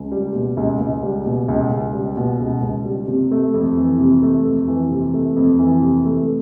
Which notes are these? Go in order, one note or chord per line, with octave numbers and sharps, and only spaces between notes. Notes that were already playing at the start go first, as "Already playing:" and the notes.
Already playing: C#2
G3
B2
C#2
C#2
G3
B2
C#2
C#2
G3
B2
C#2
C#2
G3
C3
A3
F2
E3
C3
A3
F2
E3
C3
A3
F2
E3
C3
A3